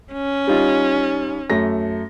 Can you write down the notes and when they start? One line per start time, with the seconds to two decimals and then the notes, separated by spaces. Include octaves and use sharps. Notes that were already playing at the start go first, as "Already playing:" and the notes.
0.13 C#4
0.47 G3 D#4 F4
1.50 F#2 A3 A#6